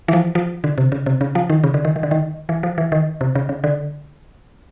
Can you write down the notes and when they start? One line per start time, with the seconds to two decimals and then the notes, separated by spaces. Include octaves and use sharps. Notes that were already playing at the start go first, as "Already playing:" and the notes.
0.08 E3
0.13 F3
0.35 F3
0.64 D3
0.78 C3
0.92 C#3
1.06 C3
1.21 C#3
1.35 F3
1.50 D#3
1.64 C#3
1.74 D3
1.85 D#3
1.96 D#3
2.03 D3
2.11 D#3
2.49 E3
2.63 F3
2.78 E3
2.92 D#3
3.21 C3
3.35 C#3
3.49 C#3
3.64 D3